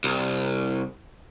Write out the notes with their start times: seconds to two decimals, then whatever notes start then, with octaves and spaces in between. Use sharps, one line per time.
0.04 C2